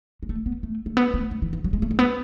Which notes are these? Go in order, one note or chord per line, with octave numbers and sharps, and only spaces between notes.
G#3
A3
B3
A3
A3
B3
A3
G#3
E3
E3
F#3
G#3
A3
G#3
B3